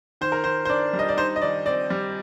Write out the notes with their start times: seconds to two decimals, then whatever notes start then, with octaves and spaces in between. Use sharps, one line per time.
0.21 D#3 C5
0.32 A#4
0.44 D#3 C5
0.65 C5
0.69 D4 D5
0.93 G3
0.99 D#5
1.09 D5
1.17 D#4 C5
1.36 D#5
1.42 D#3 D5
1.66 C4 D5
1.90 G3